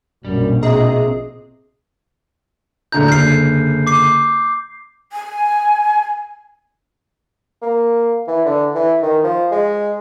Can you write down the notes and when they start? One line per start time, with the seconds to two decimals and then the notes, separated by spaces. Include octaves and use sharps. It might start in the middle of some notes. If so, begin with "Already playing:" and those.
0.25 A#1 F#2 B2 G3
0.63 C4 G#4 D#5 E5 A#5
2.92 D1 D3 A#5 G6
3.08 F#1 D3 F6 G6 C7
3.87 D6 C7
5.13 G#5
7.62 A#3
8.28 E3
8.45 D3
8.74 E3
9.02 D#3
9.24 F3
9.51 G#3